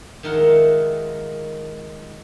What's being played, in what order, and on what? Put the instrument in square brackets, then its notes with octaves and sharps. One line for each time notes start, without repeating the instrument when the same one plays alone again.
[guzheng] D#3 G#3 F4 A#4 E5 F#5